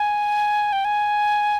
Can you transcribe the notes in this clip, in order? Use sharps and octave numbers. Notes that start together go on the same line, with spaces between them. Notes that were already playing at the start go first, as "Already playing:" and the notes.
Already playing: G#5
G5
G#5